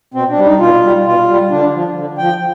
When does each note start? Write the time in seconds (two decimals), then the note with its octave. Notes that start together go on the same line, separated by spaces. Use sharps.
0.14 B2 C4
0.30 D4
0.38 G3
0.44 D#4
0.59 B2 F4
0.83 G3
1.05 B2 F4
1.28 G3
1.50 D3 D4
1.74 F3
1.96 D3
2.18 F3 G5